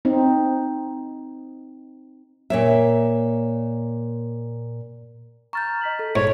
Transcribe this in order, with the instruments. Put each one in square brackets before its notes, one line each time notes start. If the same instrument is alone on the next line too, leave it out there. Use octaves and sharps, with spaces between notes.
[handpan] C4 D#4
[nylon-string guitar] A#2 C#5 E5
[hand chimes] A#5 F6 G6 [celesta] C#6 A6
[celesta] D#5 B6 F#7
[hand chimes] A4
[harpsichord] G#2 [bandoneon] C#5